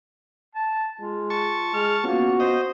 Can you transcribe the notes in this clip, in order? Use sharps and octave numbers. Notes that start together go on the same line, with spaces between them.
A5
G#3 F4
A5 C#6
G#3 F6
A#3 B3 C#4 F4 F#4
C5 D#5